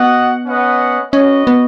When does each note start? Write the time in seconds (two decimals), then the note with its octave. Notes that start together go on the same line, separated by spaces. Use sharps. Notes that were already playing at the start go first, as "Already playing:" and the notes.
Already playing: B3 F#4 D#5 F#5
0.45 C#4 B4 D#5 F#5
1.13 C#4 F#4 B4 D#5
1.47 B3